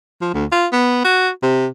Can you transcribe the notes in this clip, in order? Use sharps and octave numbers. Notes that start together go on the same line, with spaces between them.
F3
D2
F4
B3
F#4
C3